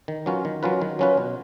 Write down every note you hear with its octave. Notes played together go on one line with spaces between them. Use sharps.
D#3
F#3 C#4 F4 B4
D#3
F#3 C#4 F4 B4
D#3
F#3 C#4 F4 B4
B2